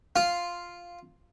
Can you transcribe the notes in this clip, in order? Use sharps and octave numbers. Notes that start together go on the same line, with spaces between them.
F4